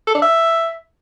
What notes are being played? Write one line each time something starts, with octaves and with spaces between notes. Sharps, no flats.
A4
D4
E5